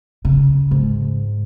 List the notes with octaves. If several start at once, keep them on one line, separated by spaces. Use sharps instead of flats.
C#3
G#2